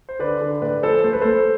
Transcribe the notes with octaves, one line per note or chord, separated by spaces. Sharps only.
C5
D3 B4 D5
D3
A2 B4 D5
F3 A4 C5
A3 C5
B4
A3 A4 C5